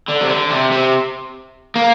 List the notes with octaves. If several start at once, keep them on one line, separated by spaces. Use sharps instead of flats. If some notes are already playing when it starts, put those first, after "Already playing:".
D3
C3
D3
C3
C3
A#3